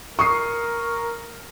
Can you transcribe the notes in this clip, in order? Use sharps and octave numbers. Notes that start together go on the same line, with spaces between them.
A#4 C#6 D#6 C7